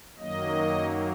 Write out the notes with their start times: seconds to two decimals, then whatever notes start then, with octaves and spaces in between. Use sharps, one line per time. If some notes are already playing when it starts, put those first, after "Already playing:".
0.18 F#2 D#3 F#3 A#3 D#5